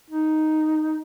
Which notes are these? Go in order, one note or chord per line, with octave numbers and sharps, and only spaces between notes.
D#4